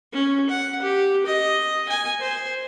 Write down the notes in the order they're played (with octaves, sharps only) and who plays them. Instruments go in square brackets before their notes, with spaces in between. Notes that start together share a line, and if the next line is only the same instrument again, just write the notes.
[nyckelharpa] C#4
F#5
G4
D#5
G#5
C5